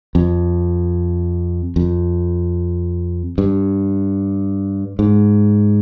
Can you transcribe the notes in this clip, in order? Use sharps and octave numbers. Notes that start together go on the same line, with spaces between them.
F2
F2
G2
G#2